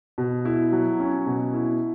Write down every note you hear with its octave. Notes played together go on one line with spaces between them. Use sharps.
B2
E4
F#3
C#4
B2
E4